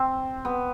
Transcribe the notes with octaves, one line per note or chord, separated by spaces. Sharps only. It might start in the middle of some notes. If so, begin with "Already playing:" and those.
Already playing: C4
B3